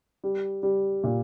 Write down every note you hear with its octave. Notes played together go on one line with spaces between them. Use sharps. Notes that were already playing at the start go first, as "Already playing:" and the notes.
G3
G3
A#2